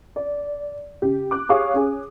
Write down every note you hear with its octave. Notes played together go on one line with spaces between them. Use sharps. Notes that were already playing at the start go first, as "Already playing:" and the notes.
D5
C#3 G4
D6 F#6
G4 G#4 C#5 F5 C#6 D#6
C#4 G#4